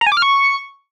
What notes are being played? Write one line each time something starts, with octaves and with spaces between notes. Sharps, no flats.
A#5
G#5
D6
F6
C#6